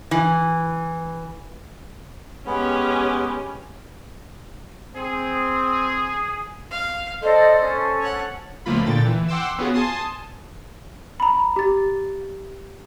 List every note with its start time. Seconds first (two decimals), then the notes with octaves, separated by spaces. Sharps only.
0.11 E3
2.46 G#3 B3 C#4 G4
4.96 C4 G#4
6.71 F5
7.22 A4 C5 D5 D#5
7.61 C#4 A4
7.99 C#5 F#5
8.66 C#2 F3 A3 A#3 F4 B5
8.86 A#2 D3 G5 A6
9.05 E3
9.28 F#5 G5 C6 D6 E6
9.58 B3 C#4 F4 F#4 G#4
9.74 G#5 A5 C6 D#6
11.20 A#5 B5
11.56 G4 A6